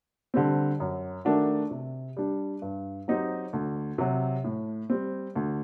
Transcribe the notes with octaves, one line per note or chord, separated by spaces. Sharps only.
D3 G3 C4
F#2
D#3 A3 D4 F#4
C3
G3 D4 G4
G2
F#3 C4 D#4 G4
D2
C3 F#3
A2
G3 C4
D2